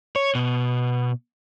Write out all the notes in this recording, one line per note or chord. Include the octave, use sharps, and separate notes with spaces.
C#5
B2